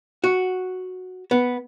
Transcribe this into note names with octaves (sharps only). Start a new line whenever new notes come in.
F#4
B3